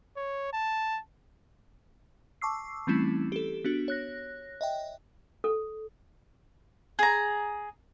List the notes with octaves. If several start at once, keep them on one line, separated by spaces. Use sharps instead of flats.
C#5
A5
A5 C#6 D6 E6 C7
E3 G3 A3 C4 C#4 E4
G4 A4
B3 D4 F#4
C#5 F#6 A#6
D#5 E5 G5
A4
G#4 A#5